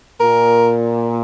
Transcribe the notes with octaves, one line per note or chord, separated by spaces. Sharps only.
A#2 A#4